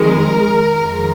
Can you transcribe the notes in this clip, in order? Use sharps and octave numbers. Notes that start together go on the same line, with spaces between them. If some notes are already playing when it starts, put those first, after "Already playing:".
Already playing: F2 D#3 G#3 A#4
F2 D#3 G#3